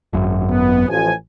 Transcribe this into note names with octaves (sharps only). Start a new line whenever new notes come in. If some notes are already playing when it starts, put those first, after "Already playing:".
G#1 F#2
B3
A1 F3 G#5